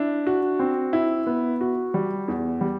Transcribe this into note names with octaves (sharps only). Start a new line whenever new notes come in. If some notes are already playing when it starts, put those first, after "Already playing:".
Already playing: D4 E4
F#4
C4
E4
B3
F#4
G3
E2
G3